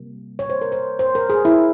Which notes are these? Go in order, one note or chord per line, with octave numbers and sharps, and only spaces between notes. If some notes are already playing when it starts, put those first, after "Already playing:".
Already playing: C3 G3 A#3
C#5
C5
A#4
C5
C5
A#4
G#4
E4